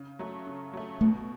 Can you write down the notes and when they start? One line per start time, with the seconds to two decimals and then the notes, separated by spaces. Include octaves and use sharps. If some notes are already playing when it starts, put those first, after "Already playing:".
Already playing: C#3
0.19 F#3 A3
0.46 C#3
0.73 F#3 A3
1.01 B2 A3